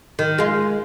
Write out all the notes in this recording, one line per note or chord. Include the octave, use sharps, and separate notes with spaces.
D#3
G#3 F4